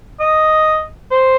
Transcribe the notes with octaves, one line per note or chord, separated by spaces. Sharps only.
D#5
C5